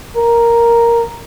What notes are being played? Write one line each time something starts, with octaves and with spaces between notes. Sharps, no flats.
A#4